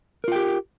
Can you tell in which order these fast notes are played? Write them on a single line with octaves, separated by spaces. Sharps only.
A#4 F4 G5 G4